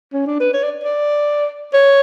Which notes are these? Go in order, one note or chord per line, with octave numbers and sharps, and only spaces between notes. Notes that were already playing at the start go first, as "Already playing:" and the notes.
C#4
D4
B4
C#5
D5
D5
C#5